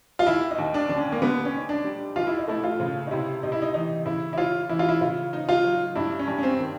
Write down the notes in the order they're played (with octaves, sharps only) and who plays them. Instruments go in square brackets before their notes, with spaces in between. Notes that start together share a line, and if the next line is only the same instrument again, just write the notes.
[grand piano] F4
[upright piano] D#2 [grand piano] E4
[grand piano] D#4
[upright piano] D#2
[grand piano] D4
[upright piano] D3 [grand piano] D4
[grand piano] C#4
A#3
[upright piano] D3 [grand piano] B3
[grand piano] C#4
[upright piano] D#4
[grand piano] D4
[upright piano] G3
[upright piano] D#2 [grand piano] F4
[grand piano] E4
D#4
[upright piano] A3 [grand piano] E4
[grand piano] F4
[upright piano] C#3
[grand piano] D#4
[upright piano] C3 [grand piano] E4
[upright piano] C3 [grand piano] D#4
[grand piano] E4
D#4
[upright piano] E3 [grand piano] D#4
[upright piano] C#3 [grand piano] E4
[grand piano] E4
[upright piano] C#4 [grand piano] F4
[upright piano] E3 [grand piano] E4
[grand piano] F4
E4
[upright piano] C#3 [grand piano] F4
[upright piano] D#4
[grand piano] F4
[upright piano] F#3
[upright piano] G2 [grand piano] E4
[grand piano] C#4
[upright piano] G2
[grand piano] C#4
C4
[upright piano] D#3